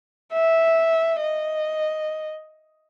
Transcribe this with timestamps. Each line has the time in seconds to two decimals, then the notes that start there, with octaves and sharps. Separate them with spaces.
0.33 E5
1.21 D#5